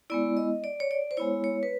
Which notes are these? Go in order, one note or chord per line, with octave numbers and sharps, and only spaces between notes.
G#3 B3 E4 D5
D#5
D5
C#5
D5
C5
G#3 B3 E4 C#5
C#5
B4